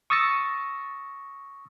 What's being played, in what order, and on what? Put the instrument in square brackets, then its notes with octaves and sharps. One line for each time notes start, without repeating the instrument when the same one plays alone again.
[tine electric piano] C#6 D#6 E6 A6 A#6 C#7